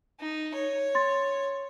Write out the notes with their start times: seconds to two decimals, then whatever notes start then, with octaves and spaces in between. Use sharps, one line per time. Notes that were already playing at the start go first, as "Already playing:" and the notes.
0.20 D#4
0.55 C#5
0.95 C6 A6